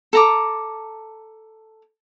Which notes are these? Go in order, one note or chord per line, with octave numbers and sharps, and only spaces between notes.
A4 A#5 D6